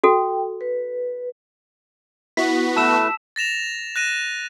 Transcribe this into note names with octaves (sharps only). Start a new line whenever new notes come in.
F#4 A4 G5
B4
B3 E4 F#4 B6
A3 B4 A5 E6 E7
A6 A#6 E7 F7
F#6 A#6 D#7 E7